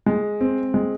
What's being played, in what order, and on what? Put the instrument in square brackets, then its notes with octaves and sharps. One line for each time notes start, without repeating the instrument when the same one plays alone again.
[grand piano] G#3
C4
G#3